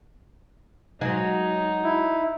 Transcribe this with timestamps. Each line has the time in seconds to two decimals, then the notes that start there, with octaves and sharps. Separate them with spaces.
1.01 F#3 G#3 D#4
1.84 E4